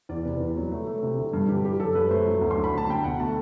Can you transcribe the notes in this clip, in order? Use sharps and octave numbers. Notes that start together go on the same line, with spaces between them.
E2 D5
C3 B4
E2
F#3
A3
A3
C3
D3
G2
G2 G4
G3 G4
F#2 A4
F#2 B4
A3 C5
F#3
D2
C6
D3
B5
D2 A5
D2 G5
B2 F#5
A3 A5